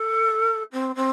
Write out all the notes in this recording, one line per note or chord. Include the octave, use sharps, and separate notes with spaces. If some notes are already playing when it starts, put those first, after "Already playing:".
Already playing: A4
C4
C4